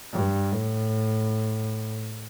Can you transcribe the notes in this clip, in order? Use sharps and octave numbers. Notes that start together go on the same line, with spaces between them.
G2
A2